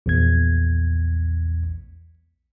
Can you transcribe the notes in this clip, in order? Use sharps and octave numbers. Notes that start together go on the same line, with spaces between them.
A#1 E2 G#6